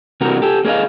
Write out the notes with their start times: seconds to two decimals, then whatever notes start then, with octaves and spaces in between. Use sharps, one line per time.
0.21 C3 E3 G3 A#3 F#4 A#4
0.42 G4 A4
0.65 A#3 G#4 B4 C#5 D#5 F5